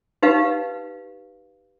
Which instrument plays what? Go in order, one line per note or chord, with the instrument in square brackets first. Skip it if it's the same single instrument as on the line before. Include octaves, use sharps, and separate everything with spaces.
[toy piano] D#4 G4 B4 F5